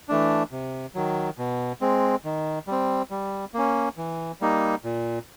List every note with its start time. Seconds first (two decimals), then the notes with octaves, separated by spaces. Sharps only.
0.09 E3 A3 D4
0.52 C3
0.95 D#3 F#3
1.38 B2
1.81 G#3 C4
2.24 D#3
2.67 G3 C4
3.11 G3
3.54 A#3 C#4
3.97 E3
4.41 G3 A#3 D#4
4.84 A#2